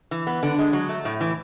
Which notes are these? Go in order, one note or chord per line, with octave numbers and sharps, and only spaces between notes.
E3
B3
D3
G#3
F#3
A3
A2
E3